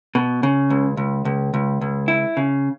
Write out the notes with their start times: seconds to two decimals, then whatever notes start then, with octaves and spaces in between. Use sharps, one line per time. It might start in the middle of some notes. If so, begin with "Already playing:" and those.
0.15 B2
0.43 C#3
0.70 C#2
0.97 C#2
1.25 C#2
1.54 C#2
1.81 C#2
2.08 E4
2.37 C#3